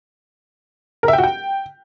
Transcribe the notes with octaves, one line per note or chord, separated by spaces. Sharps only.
A#4
E5
G5
F#4
G5